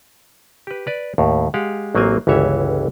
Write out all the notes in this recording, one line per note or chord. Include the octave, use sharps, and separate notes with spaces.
G4 B4
B4 D5
D#2 A2
G#3 G4 F5 F#5
A1 F#3 A#3 C4 G#5
G1 C#2 E3 C#5 E5